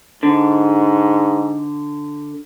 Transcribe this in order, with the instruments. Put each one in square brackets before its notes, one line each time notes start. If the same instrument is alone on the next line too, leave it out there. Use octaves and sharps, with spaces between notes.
[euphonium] G#2 [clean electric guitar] D3